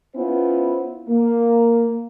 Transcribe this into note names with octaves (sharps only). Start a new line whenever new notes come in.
B3 C#4 E4 F4 C5
A#3